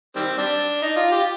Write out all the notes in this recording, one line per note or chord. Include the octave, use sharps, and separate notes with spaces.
D#3 G3 C4
G3 D4
D#4
F4
G4